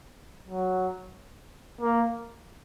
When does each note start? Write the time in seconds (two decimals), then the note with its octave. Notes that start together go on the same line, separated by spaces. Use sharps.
0.48 F#3
1.81 A#3